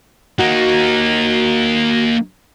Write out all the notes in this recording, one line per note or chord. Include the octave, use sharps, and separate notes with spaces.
A#3 D#4 F#4